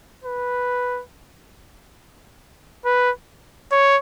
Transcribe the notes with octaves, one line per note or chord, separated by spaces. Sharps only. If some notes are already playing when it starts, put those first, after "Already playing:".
B4
B4
C#5